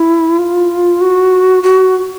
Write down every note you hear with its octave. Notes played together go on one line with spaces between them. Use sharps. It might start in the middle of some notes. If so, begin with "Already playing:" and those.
Already playing: E4
F4
F#4
F#4